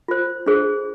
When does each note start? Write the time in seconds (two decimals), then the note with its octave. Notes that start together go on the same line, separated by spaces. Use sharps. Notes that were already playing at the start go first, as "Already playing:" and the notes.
0.08 F4 C5
0.46 D4 G#4 C5